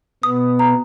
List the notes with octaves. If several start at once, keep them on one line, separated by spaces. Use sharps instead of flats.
B2 B3 D#6
A#5